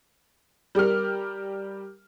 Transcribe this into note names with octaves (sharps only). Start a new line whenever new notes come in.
G3 G4 A#4 F6